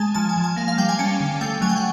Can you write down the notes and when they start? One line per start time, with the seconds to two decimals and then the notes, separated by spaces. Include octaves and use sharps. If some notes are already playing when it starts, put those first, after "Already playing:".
Already playing: G#3 G#5 A5
0.15 F3 A5
0.29 G#5
0.36 F3
0.44 G#5
0.56 A#3 F5
0.68 F5
0.78 G3 G5
0.89 G#5
0.99 C#4 A5
1.20 D3
1.41 A3 G5
1.61 F#3 G#5
1.69 G5
1.77 F#5